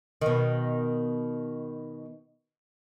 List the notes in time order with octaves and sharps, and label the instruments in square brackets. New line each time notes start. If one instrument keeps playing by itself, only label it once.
[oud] B2 D#3